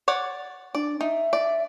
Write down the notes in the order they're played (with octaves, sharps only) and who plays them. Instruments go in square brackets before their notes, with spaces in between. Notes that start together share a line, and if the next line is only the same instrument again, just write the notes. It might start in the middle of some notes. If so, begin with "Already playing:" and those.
[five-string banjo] C#5 D5 F#5
[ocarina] D4 [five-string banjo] D5
[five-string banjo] D#4 [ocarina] E5
[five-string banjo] D5